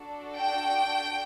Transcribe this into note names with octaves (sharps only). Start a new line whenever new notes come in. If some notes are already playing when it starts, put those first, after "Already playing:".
Already playing: D4 F#4 A4
G5